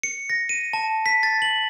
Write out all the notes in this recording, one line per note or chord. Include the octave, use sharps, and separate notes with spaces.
C#7
A#6
D#7
A5
B6
A6
F#7